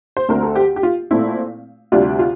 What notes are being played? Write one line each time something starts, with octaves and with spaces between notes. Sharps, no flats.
C5
D2 D3 A3 C4 A#4
A4
G4
G4
F4
A#2 A3 C4 E4
D2 C3 G3 D4 F4
F4